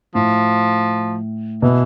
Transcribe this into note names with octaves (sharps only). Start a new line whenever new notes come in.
A2 F3
B2 E3